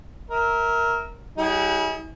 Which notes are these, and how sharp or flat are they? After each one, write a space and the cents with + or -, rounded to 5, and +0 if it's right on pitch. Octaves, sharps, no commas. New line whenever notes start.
A#4 +0 E5 -30
G3 -40 E4 -40 G#4 +0